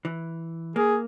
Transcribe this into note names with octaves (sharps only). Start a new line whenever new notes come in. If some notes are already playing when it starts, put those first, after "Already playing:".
E3
A#3 G#4